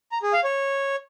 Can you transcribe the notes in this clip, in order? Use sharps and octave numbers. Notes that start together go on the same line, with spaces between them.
A#5
G#4
F5
C#5